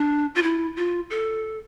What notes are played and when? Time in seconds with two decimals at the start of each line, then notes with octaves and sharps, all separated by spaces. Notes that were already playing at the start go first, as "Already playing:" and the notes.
Already playing: D4
0.35 F4
0.43 E4
0.77 F4
1.10 A4